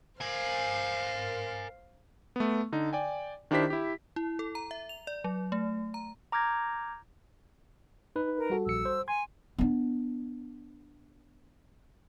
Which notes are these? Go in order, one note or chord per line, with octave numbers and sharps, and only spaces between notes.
A#4 C5 F5 G#5
A3 B3
D3 D#4
D5 G5 G#5
D#3 D4 E4 G4 C5 B6
E4 G4
E4
A4
A#5
E5
F7
D5
F#3
A3
A#5
A#5 D6 F6 G6 G#6 A#6
D#4 B4
A#4
G3 F#4 A4
A#1 E6 C#7
C5
G#5 C6 G#6
B3 D4